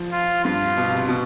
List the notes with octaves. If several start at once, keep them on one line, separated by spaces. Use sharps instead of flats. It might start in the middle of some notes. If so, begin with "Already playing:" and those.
Already playing: F3
F4
G2 F4
B2
C3
B2